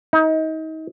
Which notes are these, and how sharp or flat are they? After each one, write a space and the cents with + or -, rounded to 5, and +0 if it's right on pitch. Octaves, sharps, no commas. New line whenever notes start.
D#4 +30